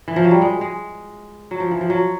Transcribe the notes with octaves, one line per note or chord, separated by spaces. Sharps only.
E3
F3
F#3
G3
G#3
G#3
F#3
F3
E3
F3
F#3